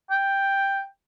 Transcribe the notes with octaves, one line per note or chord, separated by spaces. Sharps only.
G5